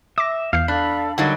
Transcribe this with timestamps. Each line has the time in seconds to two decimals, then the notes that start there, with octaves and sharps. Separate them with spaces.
0.18 E5 D6 A#6
0.53 E2 F5 G6 C7
0.68 D4 A4 F5 B5 F#6
1.18 D3 F#3 G3 D#4 A#4 C#5 D#5 F5